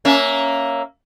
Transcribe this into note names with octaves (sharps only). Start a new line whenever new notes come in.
A#3 C#4 E5